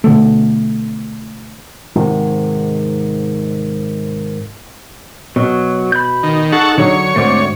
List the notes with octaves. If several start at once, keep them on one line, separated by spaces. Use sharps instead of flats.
B2 D3 A3
G#2 C3 D#3
B2 F#3
B5 G6
D#3
D#4 G#4 A4 F#5 C#6
D3 F#3 C#5
D2 G#2 A3 C4 D6